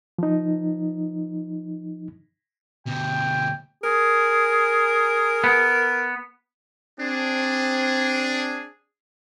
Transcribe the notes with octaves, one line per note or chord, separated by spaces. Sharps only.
F3 D#4
D2 B2 G5
G#4 A#4
B3
C4 D4 G#4